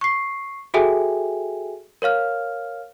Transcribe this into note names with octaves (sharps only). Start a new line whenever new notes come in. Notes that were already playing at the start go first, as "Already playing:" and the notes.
C#6 C7
F#4 G#4 A4 E5 G5 G#5
A#4 C#5 F5 F6